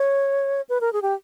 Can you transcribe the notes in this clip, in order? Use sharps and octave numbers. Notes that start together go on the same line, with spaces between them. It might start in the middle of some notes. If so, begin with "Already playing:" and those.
Already playing: C#5
B4
A#4
G#4
G4